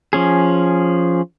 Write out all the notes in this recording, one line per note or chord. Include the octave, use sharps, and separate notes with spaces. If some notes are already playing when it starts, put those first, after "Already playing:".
F3 C#4 G#4